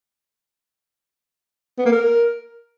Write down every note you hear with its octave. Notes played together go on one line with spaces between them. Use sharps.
B3
A#3
A#4